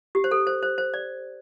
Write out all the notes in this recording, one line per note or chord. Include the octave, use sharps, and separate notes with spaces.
G4
C5
A4
C5
C5
C5
D5